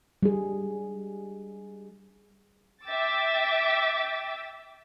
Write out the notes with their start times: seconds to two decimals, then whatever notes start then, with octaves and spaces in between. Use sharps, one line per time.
0.23 G3 G#4
2.85 E5 G5 D6 E6 A6